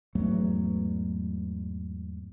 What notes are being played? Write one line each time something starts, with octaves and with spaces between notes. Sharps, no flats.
E2 G#2 F#3 A3